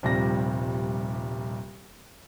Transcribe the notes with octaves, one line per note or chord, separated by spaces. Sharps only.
D#1 C3 F3 G3 A#6